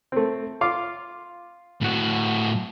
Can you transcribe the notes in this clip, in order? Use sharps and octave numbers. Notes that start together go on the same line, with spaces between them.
A3 C4
F4 F5 D6
A2 F#4